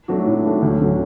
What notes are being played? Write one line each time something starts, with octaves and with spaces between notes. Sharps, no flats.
F#3 A3 D4 F#4
A2
F#3 A3 D4 F#4
D2
D3 F#3